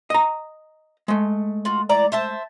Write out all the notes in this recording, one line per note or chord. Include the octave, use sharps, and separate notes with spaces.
D#5 A#5
G#3 A3
F4 F#4
E3 D5 A#5
C5 E5 A5